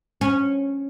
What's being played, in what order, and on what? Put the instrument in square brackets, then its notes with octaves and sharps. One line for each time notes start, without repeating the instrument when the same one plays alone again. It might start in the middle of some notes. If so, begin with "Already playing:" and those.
[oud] C#4